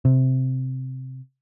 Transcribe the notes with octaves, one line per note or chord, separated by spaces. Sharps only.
C3